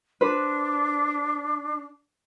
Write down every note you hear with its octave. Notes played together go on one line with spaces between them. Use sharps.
D4 B4 C5